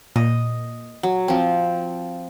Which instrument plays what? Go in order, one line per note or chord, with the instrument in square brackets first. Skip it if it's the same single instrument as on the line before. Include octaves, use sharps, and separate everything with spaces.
[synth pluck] A#2 [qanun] D#5
[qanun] F#3
F3 C4